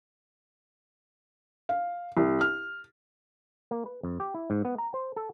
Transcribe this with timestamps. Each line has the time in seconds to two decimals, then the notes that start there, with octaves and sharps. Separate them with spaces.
1.69 F5
2.17 C2
2.41 F6
3.71 A#3
3.86 B4
4.03 F2
4.20 G4
4.34 E4
4.50 G#2
4.65 B3
4.78 A#5
4.94 C5
5.16 A4